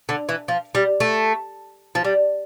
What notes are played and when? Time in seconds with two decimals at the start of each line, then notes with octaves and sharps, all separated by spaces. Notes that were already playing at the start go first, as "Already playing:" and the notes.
0.09 D3
0.29 E3
0.48 F3
0.75 G3
1.00 A3
1.95 F3
2.04 G3